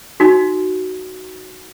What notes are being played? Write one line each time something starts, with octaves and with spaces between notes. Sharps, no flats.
D#4 F#4